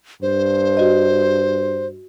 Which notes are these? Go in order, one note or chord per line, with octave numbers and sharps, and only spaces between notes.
G2 C5
F#4 D#5